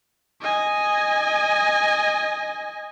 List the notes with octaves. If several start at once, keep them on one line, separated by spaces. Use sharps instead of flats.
D#5 G#5